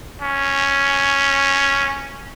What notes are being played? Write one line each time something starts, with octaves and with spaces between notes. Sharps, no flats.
C#4